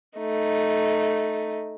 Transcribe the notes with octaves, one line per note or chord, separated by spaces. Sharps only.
A3 D#4